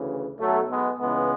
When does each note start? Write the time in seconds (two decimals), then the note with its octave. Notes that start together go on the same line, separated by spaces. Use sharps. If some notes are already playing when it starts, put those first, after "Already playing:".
Already playing: D2 C#3 E3
0.39 B1 B2 F#3 A3
0.70 G#3 B3
0.99 C#2 C#3 E3 G#3 B3